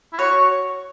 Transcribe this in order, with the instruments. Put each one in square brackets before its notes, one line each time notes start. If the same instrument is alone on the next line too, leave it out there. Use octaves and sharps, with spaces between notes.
[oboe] E4
[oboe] F#4 [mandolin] C#5